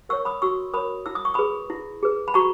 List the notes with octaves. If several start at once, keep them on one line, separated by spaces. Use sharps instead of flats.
A#4 C#5 C#6 E6
B5 D#6
F#4 C#6 E6
A#4 C#5 B5 D#6
E4 E6
D#6
C#6
G#4 B4 B5 D#6
E4
G#4 B4
B5
F#4 A#5 C#6